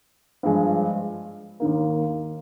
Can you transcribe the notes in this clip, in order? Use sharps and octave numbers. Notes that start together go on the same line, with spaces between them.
G2 F3 G#3
D#2 D#3 A#3